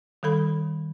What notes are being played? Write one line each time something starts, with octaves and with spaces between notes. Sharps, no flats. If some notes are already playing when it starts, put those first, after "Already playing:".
D#3 G3 A4 B5